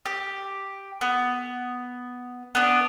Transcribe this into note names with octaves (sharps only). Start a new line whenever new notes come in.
G4
B3
B3 D4